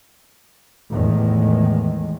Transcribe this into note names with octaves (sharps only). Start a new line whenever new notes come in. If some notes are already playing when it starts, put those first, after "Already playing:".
E2 A2 D#3 G#3